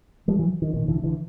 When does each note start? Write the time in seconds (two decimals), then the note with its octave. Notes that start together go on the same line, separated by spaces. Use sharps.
0.28 F3 G3
0.39 E3 F#3
0.62 D#3
0.74 B1 A#2 D#3
0.88 D3 E3
1.03 D3 E3